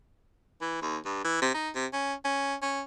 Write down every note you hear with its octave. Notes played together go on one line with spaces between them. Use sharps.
E3
D#2
G2
E3
C3
D#4
C3
C#4
C#4
C#4